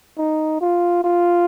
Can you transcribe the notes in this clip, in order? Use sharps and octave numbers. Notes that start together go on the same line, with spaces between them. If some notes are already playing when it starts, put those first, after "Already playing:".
D#4
F4
F4